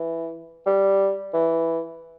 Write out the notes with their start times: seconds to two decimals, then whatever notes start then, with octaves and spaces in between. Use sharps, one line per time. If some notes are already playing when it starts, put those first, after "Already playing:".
Already playing: E3
0.67 G3
1.34 E3